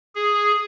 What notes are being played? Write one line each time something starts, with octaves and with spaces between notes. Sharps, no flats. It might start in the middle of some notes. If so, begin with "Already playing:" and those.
G#4